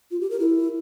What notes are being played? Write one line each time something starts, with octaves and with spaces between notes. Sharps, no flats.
F4
G4
A#4
E4